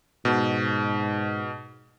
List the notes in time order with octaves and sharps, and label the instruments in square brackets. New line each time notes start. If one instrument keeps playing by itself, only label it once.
[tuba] G#2 [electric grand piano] B2